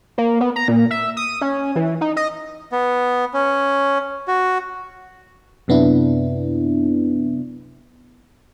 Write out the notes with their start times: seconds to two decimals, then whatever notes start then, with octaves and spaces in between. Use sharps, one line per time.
0.18 A#3
0.41 B3
0.56 A#5
0.68 A#2
0.91 E5
1.17 D#6
1.41 C#4
1.76 E3
2.01 D#4
2.17 D#5
2.72 B3
3.34 C#4
4.28 F#4
5.68 F#2 C3 B3 D4 E4